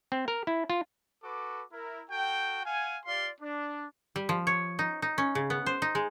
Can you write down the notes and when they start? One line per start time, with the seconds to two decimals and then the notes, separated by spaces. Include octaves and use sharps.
0.12 C4
0.28 A#4
0.47 E4
0.70 F4
1.23 F#4 A4 B4 D6
1.73 E4 A#4
2.10 F#4 A4 G5
2.65 F5 F#5 G#5
3.06 F4 G4 D5 F5 C6
3.41 D4
4.16 G3
4.29 F3
4.47 C#5
4.79 D#4
5.02 D#4
5.18 C#4
5.35 C#3
5.50 B3
5.66 C5
5.82 D#4
5.95 G#3